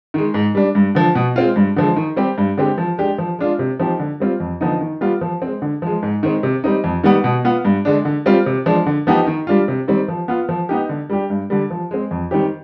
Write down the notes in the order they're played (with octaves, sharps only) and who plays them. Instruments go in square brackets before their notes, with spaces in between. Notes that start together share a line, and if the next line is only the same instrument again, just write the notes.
[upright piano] D#3 G#3
G#2
G3 D4
G2
D3 F3
B2
G#3 C4 F4
G2
D3 F3 G#3
D#3
G3 C4 G4
G2
D3 G#3 C4 G4
F3
G#3 D4 G4
F3
G#3 D4 F4
C3
F3 C4 D#4 G4
D3
G3 C4 F4
F2
D3 F3 B3 D#4
D#3
G3 B3 F4
F3
G#3 C4
D3
F3 G#3
G#2
D#3 G#3 C4
C3
G3 C4 D#4
F2
D#3 G3 B3
B2
B3 F4
G2
D3 G#3 D4
D3
G3 C4 F4
C3
F3 G#3 D4
D3
F3 B3 D#4 G4
D#3
G3 D4 F4
C3
D#3 G3 C4
F3
B3 F4
F3
B3 D#4 G4
D3
G3 D4 G4
G2
D3 G3
F3
G#3 C4
F2
D#3 G3 C4 G4